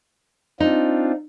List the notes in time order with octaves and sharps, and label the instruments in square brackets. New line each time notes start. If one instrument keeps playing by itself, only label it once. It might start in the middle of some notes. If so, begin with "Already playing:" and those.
[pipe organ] C4 D4 F4 [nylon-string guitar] D#4